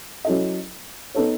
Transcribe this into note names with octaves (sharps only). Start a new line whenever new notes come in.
F#3 C#4 E4 A4 D#5
B3 D#4 A4 C#5